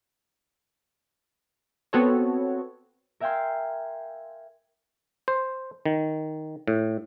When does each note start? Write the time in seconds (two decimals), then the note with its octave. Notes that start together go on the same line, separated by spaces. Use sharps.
1.93 B3 C4 F#4 A4 C#5
3.20 A#4 E5 F5 G5 G#5 C6
5.28 C5
5.86 D#3
6.68 A2